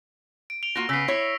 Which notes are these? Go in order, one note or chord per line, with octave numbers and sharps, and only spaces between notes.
D7
D7 F7 G7
A#3 F4 F#4 A#6
C#3 B3 E6 B6 C7
E4 C#5